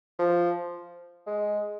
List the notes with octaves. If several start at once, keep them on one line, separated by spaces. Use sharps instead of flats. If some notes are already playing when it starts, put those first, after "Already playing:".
F3
G#3